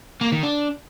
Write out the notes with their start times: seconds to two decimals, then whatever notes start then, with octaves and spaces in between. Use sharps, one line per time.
0.21 A#3
0.32 D#3
0.43 D4